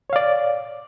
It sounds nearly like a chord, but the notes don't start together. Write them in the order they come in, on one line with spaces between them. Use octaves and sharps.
C#5 F5 D5